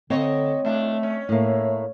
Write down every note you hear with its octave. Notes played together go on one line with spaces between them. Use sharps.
D3 A3 C4 C#5 D#5
A2 A3 D4
C#4
A2 A3 A#3